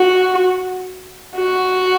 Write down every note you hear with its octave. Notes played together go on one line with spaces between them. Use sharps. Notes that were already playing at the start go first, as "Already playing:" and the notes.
Already playing: F#4
F#4